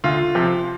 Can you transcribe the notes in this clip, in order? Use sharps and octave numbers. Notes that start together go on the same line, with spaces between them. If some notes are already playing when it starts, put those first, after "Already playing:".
D2 F4
C3 F3